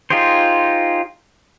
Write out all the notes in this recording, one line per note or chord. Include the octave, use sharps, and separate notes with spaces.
D#4 F4 G4 G#4 C5